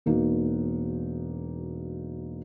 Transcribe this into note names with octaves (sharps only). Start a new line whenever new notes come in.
E1 A#3 D#4 F#4